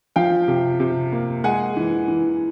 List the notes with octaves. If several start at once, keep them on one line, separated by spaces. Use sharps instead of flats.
F3 F5 G5
C3
C3
A#3
G#3 F#5 G#5
E3
E3